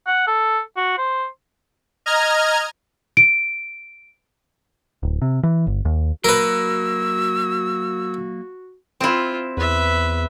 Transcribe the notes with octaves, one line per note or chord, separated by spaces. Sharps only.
F#5
A4
F#4
C5
D#5 A#5 F6 G#6
D7
D1
C3
E3
G1
D#2
F#3 A#3 F#4 A#4 B4 E6
C4 E4 F4
E2 B4 E5